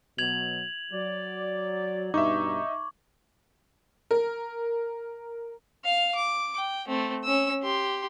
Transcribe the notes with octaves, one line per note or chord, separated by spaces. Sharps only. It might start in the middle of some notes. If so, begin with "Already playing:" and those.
B2 F#3 G#6 F7 F#7
F#3 D5
G2 B2 D#4 E5 C#6 D6
A#4
F5 F6
D6
G5
A3 C4
C#4 E6
G4 C6